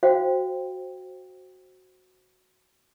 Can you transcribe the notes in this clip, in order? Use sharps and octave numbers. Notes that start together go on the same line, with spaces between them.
F#4 C5 F5 G5